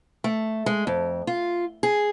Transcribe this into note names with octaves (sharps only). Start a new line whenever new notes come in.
A3
G#3
F2
F4
G#4